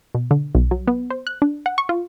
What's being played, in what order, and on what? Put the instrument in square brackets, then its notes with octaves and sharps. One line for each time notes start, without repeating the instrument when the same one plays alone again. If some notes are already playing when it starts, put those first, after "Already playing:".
[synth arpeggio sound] B2
D3
B1
F#3
B3
C5
F#6
D4
F#5
C#6
F4